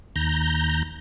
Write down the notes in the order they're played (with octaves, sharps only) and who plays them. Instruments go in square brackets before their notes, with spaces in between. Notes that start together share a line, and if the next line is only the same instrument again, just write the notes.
[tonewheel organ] D#2 A#5 G6